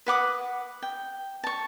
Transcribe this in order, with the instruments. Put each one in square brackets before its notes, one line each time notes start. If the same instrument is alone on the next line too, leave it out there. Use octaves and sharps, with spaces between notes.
[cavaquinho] B4 F#5 D6 D#6
G5
A5 C#6